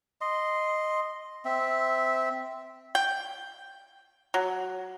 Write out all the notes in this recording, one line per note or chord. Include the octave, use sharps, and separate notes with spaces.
D#5 C6
C4 E5
G5
F#3